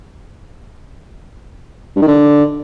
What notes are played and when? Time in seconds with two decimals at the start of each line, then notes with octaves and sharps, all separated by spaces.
1.96 G2
2.02 D#3
2.08 D3